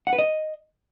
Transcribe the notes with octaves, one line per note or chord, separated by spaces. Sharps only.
F#5
B4
D#5